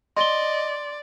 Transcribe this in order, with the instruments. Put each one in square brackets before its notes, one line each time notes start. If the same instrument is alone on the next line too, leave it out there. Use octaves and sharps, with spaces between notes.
[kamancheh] D5 [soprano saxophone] D#5 [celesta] C6 G7